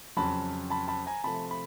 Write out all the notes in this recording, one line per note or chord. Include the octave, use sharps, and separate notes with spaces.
F2 C#3 F#3 A5 B5
A5 B5
A5 B5
G#5 A#5
C3 F3 A3 A5 B5
B5